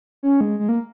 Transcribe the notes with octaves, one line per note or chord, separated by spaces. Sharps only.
C#4
G#3
G#3
A#3